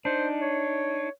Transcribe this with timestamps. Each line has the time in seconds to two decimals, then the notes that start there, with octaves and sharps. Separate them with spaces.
0.05 D4 D#4 C5
0.41 C#5